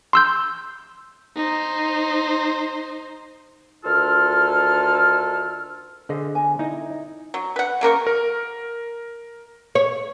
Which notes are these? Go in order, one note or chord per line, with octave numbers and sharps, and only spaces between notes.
C6 E6 G6
D#4 C5
D2 D#3 F4 A4 F6
D3 G#4 C5 D#5
G#5
D#4 E4 D#5
F#3
B4 F#5
C#3 A#3 A#4 C#6
A#4
C#5